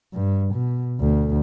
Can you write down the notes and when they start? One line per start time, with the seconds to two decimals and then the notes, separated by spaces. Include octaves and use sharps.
0.13 G2
0.54 B2
1.00 D2